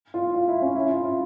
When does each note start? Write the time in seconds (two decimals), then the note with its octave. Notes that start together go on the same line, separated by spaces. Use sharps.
0.14 F4
0.35 F4
0.48 E4
0.62 C#4
0.75 E4
0.89 F4
1.02 E4